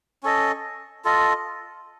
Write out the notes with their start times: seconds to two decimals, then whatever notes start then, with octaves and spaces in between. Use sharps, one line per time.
0.23 C#4 A4 D#5
1.05 F4 A4 D#5